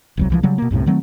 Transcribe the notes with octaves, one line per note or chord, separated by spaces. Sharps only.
E1 C2 F#3
C2 E3 F3
C#3 F#3 G3
B2 A#3
C2 F#2 A2 C3
D#3 F#3 A3 C4